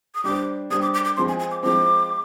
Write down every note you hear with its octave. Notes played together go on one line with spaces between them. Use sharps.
D#6
G3 D4 G4 C5 D6
G3 D4 G4 C5 D#6
D6
D6
D6
F3 G#3 C4 C6
G#5
G#5
D6
F3 G#3 C4 D6